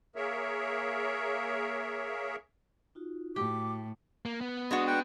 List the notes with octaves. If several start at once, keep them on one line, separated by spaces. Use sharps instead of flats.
A#3 G#4 A#4 C#5 E5
D#4 F4 F#4
A2 F#4 G4 D6
A#3
B3
G#3 D4 F#4
F#5 G5